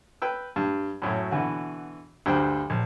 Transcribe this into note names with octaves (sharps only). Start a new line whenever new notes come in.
B4 G5 E6
G2
F#2 A2 F#3
B2 D3 E3 F#4
D2 G2 C5 G5
A#1